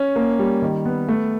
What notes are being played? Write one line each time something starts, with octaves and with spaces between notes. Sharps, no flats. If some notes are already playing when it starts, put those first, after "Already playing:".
Already playing: C#4
A#3
G3
D#3
B3
A3